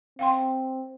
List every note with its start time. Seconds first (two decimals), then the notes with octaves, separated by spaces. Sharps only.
0.19 C4 F5 G5 C6